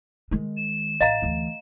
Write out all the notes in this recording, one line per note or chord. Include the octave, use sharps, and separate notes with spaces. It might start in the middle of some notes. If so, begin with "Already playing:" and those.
D#3 G#3
E7
A1 D#5 F5 A#5
D2 E3